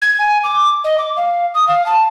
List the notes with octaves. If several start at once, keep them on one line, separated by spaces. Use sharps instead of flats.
G#6
G#5
D6
D#5
D6
F5
D#6
F5
A5